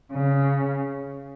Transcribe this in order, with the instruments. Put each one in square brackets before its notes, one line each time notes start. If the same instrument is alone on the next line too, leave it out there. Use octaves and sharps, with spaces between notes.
[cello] C#3